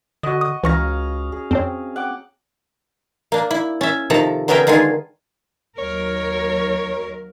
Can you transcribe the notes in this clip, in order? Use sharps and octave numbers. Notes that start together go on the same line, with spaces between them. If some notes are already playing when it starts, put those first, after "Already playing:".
D3 F#4 D#5
D#6
C#2 E3 C#4 F5 A#5 C#6 A#6
G#4
F2 C4 D4 C#5
F#5 G5 D6
A#3 D4
E4
C#4 E5
C3 D#3 F3 A4 A5 A#5
D3 B3 C#4 A#4 E5 G5
D3 D#3 G#3 F4 G#5
D#2 F#3 A#4 C#5